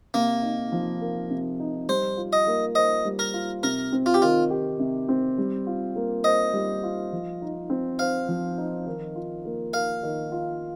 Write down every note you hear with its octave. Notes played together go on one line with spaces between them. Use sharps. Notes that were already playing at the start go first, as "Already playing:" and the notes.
C3 A#3
D#4
F3
A#4
C3
D#4
G3 C5
F4
D#5
A#3
C5 D#5
G3
A#4
F4
C3 A#4
C4
F4
G4
D#3 F4
G4
C3
C4
G3
F4
A#3
C5 D#5
G3
F4
F3
D#4
C4
C5 F5
F3
D#4
D#3
F4
A#3
A#4 F5
D#3
F4